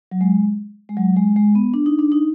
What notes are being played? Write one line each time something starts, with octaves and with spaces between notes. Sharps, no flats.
F#3
G#3
G#3
F#3
G#3
G#3
B3
D4
D#4
D4
D#4